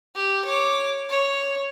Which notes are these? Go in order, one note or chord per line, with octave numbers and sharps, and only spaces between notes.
G4
C#5 D6
C#5